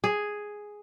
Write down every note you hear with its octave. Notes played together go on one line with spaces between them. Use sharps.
G#4